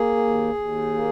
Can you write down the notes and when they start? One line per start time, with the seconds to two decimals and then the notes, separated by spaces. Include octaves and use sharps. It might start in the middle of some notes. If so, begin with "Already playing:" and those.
Already playing: A#3 G#4
0.16 D#2
0.54 D#2
0.94 A#3